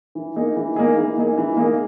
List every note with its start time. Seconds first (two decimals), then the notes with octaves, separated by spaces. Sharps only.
0.15 E3
0.36 A#3 D#4 G#4
0.56 E3
0.76 A#3 D#4 G#4
0.97 E3
1.18 A#3 D#4 G#4
1.38 E3
1.57 A#3 D#4 G#4